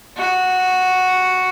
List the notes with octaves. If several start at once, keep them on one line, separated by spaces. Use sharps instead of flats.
F#4